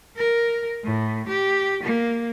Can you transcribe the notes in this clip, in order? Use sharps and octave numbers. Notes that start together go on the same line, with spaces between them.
A#4
A2
G4
A#3